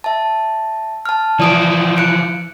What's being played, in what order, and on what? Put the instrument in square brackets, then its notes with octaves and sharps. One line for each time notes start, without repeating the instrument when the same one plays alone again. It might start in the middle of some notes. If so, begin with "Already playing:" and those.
[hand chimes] E5 A5
A5 F6
[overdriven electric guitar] E3 F3 [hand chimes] D5 D#6 D7
[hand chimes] F#6 C#7 D7